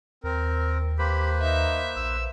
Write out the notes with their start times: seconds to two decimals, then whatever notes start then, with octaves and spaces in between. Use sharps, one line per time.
0.24 D#2 C4 A#4
0.99 A#3 G4 B4 C5 B5
1.42 D#4 E5
1.96 A#1 E6